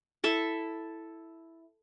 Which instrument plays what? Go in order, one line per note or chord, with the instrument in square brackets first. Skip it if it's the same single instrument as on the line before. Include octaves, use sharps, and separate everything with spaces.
[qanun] E4 A4 E5